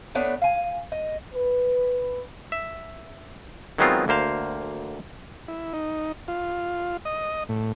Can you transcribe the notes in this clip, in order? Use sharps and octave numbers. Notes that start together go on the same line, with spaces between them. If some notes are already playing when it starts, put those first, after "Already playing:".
A3 B3 D4 C#5
F5 G#5
D#5
B4
E5
D#3 F#3 G#3 B3 C4 F4
D2 A#3 C5 F5
E4
D#4
F4
D#5
A2